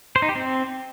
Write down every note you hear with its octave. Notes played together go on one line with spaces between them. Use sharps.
C5
D#4
G4
C4